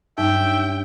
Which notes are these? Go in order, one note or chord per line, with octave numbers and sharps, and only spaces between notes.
G2 G3 C#4 D#4 E5 G5